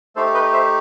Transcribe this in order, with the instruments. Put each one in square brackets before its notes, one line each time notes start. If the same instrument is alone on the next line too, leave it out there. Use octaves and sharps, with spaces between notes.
[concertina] A3 D#4 G4 A4 C5
B4 D#5
C5 E5